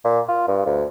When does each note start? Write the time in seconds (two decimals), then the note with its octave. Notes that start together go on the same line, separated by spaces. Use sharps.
0.05 A#2
0.28 F4
0.48 G2
0.66 D2